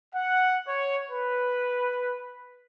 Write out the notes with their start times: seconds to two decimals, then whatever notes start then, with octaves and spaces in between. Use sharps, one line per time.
0.15 F#5
0.68 C#5
1.10 B4